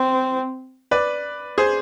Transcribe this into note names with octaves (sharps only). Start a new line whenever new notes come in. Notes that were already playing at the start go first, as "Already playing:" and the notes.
Already playing: C4
B4 D5
G#4 C5